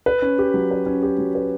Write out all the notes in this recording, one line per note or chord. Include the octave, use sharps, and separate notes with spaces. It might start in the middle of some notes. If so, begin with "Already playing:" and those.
B4
C#4
G4
F#3
B4
C#4
G4
F#3
B4